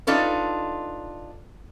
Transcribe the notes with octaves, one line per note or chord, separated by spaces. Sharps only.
D4 D#4 F4 A4 B4